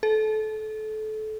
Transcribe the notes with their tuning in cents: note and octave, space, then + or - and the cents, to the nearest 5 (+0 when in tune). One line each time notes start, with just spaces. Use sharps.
A4 -25